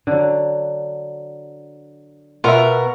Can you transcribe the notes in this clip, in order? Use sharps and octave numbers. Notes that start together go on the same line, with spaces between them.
D3 F#3
B2 F4 A#4 E5 F#5